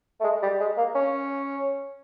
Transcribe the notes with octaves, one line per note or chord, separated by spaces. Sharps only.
A3
G#3
G3
G#3
A#3
C#4